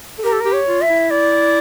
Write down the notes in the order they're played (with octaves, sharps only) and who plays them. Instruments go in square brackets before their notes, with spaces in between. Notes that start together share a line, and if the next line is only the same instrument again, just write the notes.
[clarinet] A4
[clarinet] G4 [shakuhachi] A#4
[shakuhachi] A4
[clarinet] G4 [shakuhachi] A#4
[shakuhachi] C#5
[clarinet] F4
[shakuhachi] E5
[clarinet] E4
[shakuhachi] D5